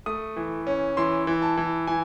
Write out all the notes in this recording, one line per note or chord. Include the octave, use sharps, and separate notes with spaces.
A3 D#6
E3
C#4
E3 C6
E3
A5
E3
E3 G#5